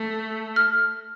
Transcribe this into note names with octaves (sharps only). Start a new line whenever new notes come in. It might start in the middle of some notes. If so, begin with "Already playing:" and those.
Already playing: A3
F6